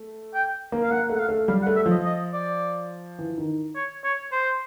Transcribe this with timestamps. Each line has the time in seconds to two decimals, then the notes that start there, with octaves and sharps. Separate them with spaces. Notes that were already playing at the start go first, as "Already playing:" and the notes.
Already playing: A3
0.34 G5
0.72 A#3
0.83 F5
0.91 A#3 F#5
1.10 A3
1.15 F#5
1.19 F5
1.29 A3
1.48 G3 F5
1.62 F#5
1.67 A3
1.76 E5
1.86 F3
1.91 D#5
2.05 D#5
2.33 D5
3.19 E3
3.38 D#3
3.75 C#5
4.04 C#5
4.32 C5